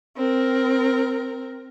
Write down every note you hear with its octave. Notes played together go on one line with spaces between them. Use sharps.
C4 A#4